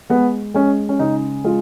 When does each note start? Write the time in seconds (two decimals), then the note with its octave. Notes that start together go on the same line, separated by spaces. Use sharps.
0.10 G#3 B3
0.54 G#3 C#4
0.89 C#4
0.99 C#3 D#4
1.44 G#3 F4